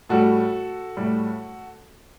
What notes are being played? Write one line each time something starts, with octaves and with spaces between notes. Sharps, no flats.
A2 G3 F#4 A4
A2 G3